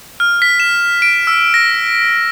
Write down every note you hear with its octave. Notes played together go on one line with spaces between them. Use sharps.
F6
B6
E7
D7
E6
A#6